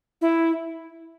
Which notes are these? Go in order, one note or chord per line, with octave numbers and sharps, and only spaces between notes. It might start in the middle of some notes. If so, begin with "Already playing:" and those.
E4